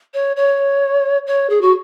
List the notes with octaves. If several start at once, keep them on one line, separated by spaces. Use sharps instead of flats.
C#5
C#5
C#5
G#4
F#4